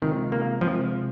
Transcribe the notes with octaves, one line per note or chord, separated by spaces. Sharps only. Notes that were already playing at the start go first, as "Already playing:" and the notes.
C3 D#3 G#3 C4 F4
A#3
C3 F3 G#3 C4 F4